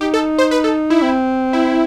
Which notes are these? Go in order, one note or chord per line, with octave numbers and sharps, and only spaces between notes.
D#4 G4
A4
C5
B4
A4
E4
C4
E4